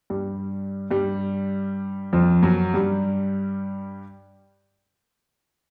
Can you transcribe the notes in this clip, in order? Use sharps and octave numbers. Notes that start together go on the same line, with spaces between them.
G2 G3
G2 G3
F2 F3
F#2 F#3
G2 G3